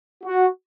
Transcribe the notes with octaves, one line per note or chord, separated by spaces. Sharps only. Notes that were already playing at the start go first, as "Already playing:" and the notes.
F#4